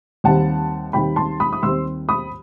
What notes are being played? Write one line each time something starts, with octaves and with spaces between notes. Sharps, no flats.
D#2 D#3 G3 C4 F#5 A5
D#2 D#3 G3 C4 G5 B5
A5 C6
B5 D#6
D#6
D#2 D#3 G3 C4 C6 E6
B5 D#6